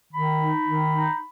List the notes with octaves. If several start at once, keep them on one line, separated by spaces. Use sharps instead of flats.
D#3 B5
D#4
D#3
D#4